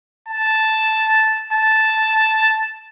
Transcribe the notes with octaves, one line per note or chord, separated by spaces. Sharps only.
A5
A5